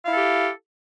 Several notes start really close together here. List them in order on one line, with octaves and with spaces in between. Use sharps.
F5 E4 A4 G4